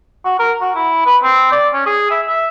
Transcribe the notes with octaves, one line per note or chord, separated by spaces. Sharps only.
F#4
A#4
F#4
E4
B4
C4
D5
C#4
G#4
E5
E5